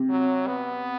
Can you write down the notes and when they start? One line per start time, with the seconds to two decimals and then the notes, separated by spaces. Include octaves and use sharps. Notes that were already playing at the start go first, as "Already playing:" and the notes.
Already playing: C3
0.10 F#3
0.47 B3